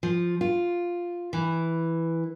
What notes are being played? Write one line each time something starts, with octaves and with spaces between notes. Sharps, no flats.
F3
F4
E3